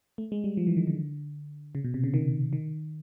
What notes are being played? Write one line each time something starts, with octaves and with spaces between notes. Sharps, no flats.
A3
G#3
G3
F3
E3
D#3
D3
C#3
B2
C3
C#3
D#3
D#3